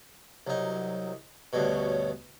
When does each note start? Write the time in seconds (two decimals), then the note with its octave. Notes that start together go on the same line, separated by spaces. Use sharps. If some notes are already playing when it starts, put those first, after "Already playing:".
0.47 C2 F#3 D#4
1.53 D2 G2 B2 C#5